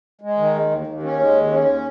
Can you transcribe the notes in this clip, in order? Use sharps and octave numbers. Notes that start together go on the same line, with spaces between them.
G#3
D#3
D#2
D#2
D#2
C#4
G#3
D#2
C#4